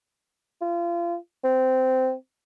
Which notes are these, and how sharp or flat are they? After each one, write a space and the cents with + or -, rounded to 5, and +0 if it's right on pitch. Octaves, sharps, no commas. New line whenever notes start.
F4 -30
C4 -15